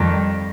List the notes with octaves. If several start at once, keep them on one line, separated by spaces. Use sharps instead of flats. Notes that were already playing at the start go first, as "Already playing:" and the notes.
Already playing: F2 D#3 G3